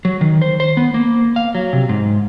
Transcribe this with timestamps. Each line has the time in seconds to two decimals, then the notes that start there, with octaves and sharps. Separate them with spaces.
0.05 F#3
0.21 D#3
0.42 C5
0.60 C5
0.77 B3
0.94 A#3
1.36 F5
1.55 F#3
1.73 C3
1.89 G#2